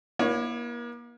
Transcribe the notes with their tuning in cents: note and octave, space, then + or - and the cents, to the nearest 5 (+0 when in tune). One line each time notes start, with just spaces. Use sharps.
A#3 +40 E4 +0 C#5 +0